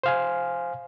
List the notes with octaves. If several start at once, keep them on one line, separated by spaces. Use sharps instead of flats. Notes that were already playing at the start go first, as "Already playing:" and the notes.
C5 F5 G#5